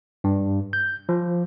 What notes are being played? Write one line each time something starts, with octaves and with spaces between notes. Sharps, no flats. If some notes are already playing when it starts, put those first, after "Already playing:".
G2
G6
F3